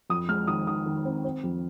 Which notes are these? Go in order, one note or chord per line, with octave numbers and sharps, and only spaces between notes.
F2 D#6
G#3 F6
D#3 D#6
D#3 D#6
D#3
C4
C4
F2